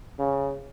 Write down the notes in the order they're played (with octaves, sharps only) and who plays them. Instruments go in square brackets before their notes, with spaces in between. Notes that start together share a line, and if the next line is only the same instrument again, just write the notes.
[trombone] C#3